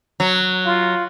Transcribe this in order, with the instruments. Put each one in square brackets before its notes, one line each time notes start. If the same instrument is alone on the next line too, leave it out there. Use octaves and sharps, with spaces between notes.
[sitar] F#3
[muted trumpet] F4